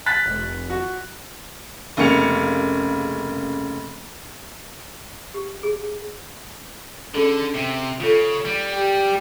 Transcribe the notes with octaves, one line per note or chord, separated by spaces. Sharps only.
F#6 A6 B6
F1
F#4
F1 C#3 A#3 C#7 F7
G4
G#4
D3 C#4 G#4 A4
C3
C#3 F4 A4
G3
G4